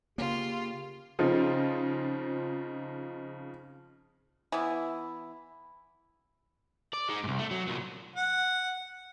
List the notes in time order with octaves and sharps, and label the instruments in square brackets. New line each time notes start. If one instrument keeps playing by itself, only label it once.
[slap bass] C#3 A#3 [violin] F4 [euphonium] G4
[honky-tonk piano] C#3 F3 C4 D#4 F4
[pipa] E3 B3 E4
[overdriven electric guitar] D5
G#3 D#4
C2 G#2
A3
F#3
C2 A#2
[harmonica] F#5